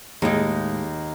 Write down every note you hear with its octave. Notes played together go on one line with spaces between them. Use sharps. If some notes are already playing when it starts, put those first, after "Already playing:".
D#2 A2 G#3 D#4